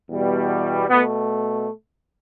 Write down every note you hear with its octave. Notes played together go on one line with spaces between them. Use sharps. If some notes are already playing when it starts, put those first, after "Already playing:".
E2 B2 G3
B2 A3 B3